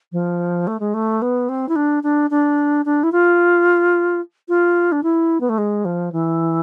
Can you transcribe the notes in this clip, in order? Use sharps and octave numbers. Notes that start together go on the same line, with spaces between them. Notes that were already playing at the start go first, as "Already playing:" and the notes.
F3
A3
G#3
A3
B3
C4
E4
D4
D4
D4
D4
E4
F4
F4
D4
E4
B3
A3
G#3
F3
E3